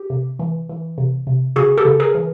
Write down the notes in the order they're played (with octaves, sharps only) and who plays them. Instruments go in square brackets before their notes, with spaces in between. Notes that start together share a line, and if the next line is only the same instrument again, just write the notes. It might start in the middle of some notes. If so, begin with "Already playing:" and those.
Already playing: [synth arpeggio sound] G4
C3
E3
E3
C3
C3
C#3 F#4 G#4
G4 A4
C#3
G#4 A#4
E3